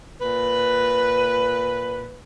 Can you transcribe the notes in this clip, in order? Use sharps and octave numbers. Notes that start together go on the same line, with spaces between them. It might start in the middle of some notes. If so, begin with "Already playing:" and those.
A#2 B4